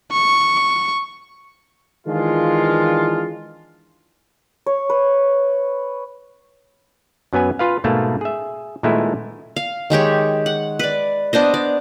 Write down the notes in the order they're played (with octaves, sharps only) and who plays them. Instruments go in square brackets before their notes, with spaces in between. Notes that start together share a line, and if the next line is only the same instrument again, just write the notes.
[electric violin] C#6
[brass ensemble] D#3 E3 G#3 D4 F4
[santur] C#5
B4
[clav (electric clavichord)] F#2 F#3 B3 B4 G#5
F4 B4 F5
G#2 B2 A3 A#3 A5
G#4 E5
A#2 D#3 G#3 A3 B3 E4
[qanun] F5
D#3 G#3 G4 C#5
F#5
B4 D5
B3 D4 C5 D#5
D5